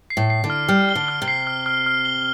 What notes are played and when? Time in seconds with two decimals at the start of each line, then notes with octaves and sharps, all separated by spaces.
0.10 C7
0.17 A2
0.30 C7
0.44 D3
0.50 F6
0.69 G3 F6
0.89 G7
0.95 D3
1.08 F6
1.22 C3
1.28 C7
1.47 F6
1.66 F6
1.86 F6
2.05 G7